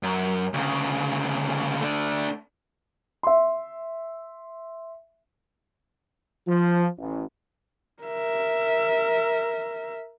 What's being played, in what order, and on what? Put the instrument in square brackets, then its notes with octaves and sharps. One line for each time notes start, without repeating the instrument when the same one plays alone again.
[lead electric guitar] F#2
D2 C#3
A3 D4
[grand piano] E5 C6
[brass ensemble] F3
A1
[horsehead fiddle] A#4 E5